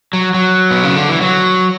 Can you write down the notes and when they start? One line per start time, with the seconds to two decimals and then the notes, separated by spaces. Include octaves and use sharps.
0.13 F#3
0.34 F#3
0.71 B2
0.83 C#3
0.96 D3
1.09 E3
1.21 F#3